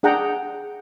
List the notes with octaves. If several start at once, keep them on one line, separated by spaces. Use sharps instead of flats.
D4 G#4 F#5 G5 A#5